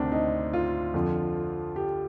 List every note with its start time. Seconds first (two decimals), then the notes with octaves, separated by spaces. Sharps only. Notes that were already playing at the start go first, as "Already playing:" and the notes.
Already playing: D2 C3 D#3 C4 D4
0.12 D#4
0.53 F4
0.94 F2 D3 F3
1.76 G4